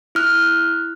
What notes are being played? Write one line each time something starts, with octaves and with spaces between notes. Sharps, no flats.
E4 F6 F#6